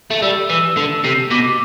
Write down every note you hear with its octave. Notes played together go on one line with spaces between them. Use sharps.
A3
G3 E6
E3
D3
C3
B2 D6